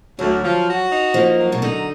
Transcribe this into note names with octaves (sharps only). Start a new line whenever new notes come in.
D2 F#3
F3
F#4
D#4
F3 A#3
F#3
B2
D3 D#4